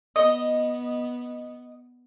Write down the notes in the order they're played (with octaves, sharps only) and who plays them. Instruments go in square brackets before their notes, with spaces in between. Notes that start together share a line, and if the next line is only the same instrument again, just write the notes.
[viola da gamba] B3 [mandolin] D#5